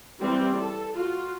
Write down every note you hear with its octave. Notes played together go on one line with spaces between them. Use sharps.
E3 G3 C4
A4
F4 F#4